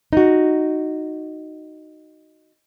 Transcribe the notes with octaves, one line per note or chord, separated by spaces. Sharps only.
D#4 F#4